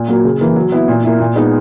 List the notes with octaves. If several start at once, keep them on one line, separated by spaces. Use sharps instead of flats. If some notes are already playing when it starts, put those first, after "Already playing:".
Already playing: A#2
F#3 A#3
C#3
E3 A#3
F#3
B3 E4
A#2
A#3 E4
A#2
G#3 B3 D#4